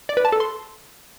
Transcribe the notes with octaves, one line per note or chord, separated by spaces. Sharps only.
D5
B4
A5
A4
C6